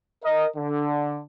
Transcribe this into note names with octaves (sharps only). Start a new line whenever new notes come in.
A#4 D#5
D3